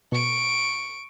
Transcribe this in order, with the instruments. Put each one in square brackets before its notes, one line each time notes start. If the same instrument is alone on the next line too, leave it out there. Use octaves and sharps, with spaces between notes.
[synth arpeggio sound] B2 [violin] C#6 D7